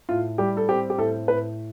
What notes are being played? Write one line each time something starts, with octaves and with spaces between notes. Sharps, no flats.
A2 F4
G3 G4
A4
C4 G4
G4
A2 A4
A2 B4